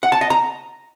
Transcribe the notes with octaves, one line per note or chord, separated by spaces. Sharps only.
F#5
A5
D#5
A#5